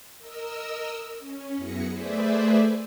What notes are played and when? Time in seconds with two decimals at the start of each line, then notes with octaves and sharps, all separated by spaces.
0.18 A#4 D#5 E6
1.19 C#4
1.56 F#2 B3 E4 G#4 A#6 C#7
1.88 A3 G#4 B4 C5 D5 E5